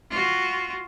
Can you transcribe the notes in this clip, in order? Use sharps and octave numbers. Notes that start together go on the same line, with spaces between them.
F4 F#4